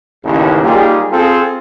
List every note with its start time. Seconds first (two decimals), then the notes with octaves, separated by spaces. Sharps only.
0.25 A1 D#2 C#3
0.63 G3 A#3 D#4 F4 G4 G#4
1.12 C4 F4 G#4 A4